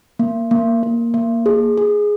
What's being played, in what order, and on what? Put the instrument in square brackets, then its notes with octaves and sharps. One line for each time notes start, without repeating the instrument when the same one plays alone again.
[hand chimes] A#3
A#3
A#3
A#3
G#4
G#4